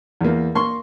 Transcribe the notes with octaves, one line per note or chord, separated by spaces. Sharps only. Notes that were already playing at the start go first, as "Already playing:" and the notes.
E2 A#3
A#3 C6 C#6